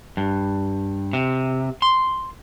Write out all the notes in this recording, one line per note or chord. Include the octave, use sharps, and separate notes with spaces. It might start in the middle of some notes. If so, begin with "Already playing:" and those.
G2
C3
C6